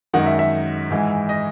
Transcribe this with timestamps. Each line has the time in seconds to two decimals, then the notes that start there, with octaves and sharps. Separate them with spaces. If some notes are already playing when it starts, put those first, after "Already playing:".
0.13 F#2 D#3 G#3 F#5
0.26 E5
0.39 E5
0.91 G#2 E3 G#3
1.29 D#5